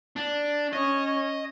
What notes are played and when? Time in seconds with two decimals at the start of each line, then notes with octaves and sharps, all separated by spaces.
0.16 D4
0.73 C#4 C#5 D#5